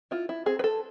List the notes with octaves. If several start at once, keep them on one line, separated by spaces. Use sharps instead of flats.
E4 F4
E4
C4 G#4
B4
A4